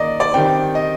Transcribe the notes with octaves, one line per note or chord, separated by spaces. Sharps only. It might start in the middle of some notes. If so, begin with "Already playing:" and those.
Already playing: D#3 A#3 D#4 D5 D#5
D5
D#3 G3 C4 G5
D#5